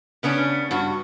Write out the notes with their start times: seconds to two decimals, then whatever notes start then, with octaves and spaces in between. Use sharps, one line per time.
0.23 C#3 B3 C#4 D4
0.71 G2 F#4